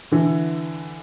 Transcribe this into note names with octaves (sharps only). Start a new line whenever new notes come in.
D3 E3